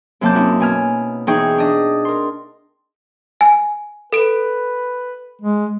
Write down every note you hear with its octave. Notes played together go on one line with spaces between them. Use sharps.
F#2 C3 A#3 A5 D6 G6
C4 C#4 D#4 E4 F#4
B2 G#5 F6
E2 D#4 G#4 G5 C#6
D4 D#5
A#4 C6
G#5
A4 B4 D7
G#3